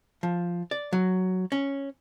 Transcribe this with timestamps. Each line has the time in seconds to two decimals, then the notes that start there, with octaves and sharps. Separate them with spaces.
0.23 F3
0.71 D5
0.93 F#3
1.52 C#4